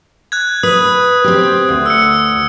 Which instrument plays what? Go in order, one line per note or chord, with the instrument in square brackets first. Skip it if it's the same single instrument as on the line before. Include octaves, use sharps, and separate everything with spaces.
[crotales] F#6 G#6
[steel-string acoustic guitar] B4 [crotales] D#6
[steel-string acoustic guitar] C4 G4
D2
[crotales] E6 C#7